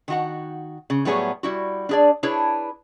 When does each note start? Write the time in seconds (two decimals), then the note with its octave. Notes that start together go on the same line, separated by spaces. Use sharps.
0.08 D#3 F#4 F#5
0.90 C#3
1.05 A2 F#3 G3 B3 G#4 C#5
1.43 G3 E4 F#4
1.89 D4 G#4 D5
2.23 D4 E4 G#4 B4 C#5